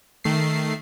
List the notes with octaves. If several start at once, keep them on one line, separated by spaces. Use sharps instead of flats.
D#3 A3 C7